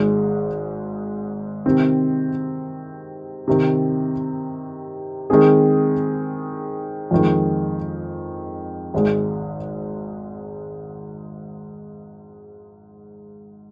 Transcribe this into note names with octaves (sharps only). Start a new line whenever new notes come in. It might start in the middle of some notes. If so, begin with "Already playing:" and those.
Already playing: G#1 G#2 G#3
C3 D#3 C4
C3 D#3 C4
D#3 G#3 C4 G#4
F2 D#3 G#3
G#1 G#2 G#3